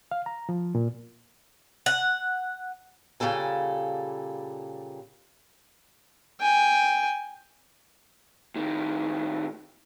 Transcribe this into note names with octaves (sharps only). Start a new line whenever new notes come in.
F5
A#5
F3
A#2
F#5
A#2 C#3 G3 A4 G#5
G5 G#5
A2 D#3